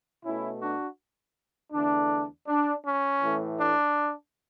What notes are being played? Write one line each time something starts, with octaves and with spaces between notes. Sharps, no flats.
B2 A3 C#4 E4
D4 F#4
E2 D3 A3 D4
D4
C#4
A2 E3 A3
D4